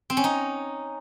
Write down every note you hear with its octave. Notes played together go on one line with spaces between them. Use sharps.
C4
C#4
D#4